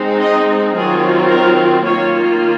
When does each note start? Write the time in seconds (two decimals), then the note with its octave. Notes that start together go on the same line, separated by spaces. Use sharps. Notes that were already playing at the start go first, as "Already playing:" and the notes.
Already playing: G#3 C4 D#4
0.19 D#5
0.75 D#3 F#3 C4 F4 G#4
1.29 A#4
1.84 D#3 A#3 F4 C#5